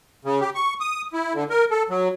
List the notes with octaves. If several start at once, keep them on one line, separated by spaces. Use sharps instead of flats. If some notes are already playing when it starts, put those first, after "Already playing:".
C#3
G4
C#6
D#6
E4
D3
A#4
A4
F#3